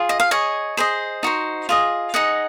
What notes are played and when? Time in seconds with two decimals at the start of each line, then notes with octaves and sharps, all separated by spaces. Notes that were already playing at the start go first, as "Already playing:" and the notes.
Already playing: F4 G#4
0.09 D#5
0.20 F5
0.31 G#4 C#5 D#5
0.77 G#4 C5 D#5
1.23 D#4 F#4 C5
1.69 F4 G#4 D#5
2.14 D#4 G#4 D#5 F#5